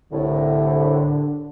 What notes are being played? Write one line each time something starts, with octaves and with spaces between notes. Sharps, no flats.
C2 A2 D3